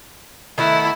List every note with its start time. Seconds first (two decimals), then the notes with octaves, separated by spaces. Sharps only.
0.58 D#3 A3 B3 E4